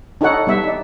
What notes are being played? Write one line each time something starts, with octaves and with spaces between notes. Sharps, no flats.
D4 D#4 F#4 A4 C#5 F#5
G3 B3 E5
D#4 D5